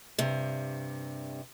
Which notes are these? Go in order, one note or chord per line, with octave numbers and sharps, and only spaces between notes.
G2 C3